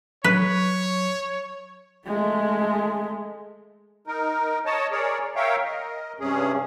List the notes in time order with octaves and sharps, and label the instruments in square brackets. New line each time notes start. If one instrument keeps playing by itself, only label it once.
[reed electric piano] F#3 [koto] B4 [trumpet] C#5
[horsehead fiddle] G#3 A3
[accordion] D#4 A#4
C#5 D#5 A5
G#4 A#4 C#5 D5
A#4 C#5 E5 F5 G5
A#4 D#5
G2 C3 C#4 G#4